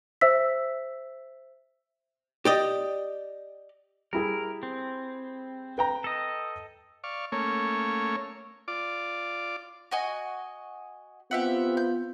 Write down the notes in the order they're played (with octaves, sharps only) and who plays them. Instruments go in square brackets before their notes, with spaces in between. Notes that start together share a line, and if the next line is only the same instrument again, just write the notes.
[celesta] C5 E5 E6 B6
[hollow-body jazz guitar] G4 D5 D#5
[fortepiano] G3 E4 G#4 [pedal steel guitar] A#4
[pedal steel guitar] C4
[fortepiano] B4 G5 A#5
[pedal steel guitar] A4 D#5
[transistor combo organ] D5 F5 C#6
A3 A#3 C#4 C#5
F4 D5 D6
[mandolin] F#4 D#5 G#5
[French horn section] B3 C4 F4 [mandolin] G4 E5 F#5
[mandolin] G6